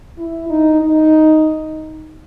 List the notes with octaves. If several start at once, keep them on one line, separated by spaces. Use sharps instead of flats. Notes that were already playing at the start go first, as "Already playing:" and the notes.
E4
D#4
D#4